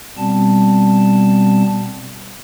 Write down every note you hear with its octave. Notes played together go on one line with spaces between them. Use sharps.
B2 G3 B3 C4 A5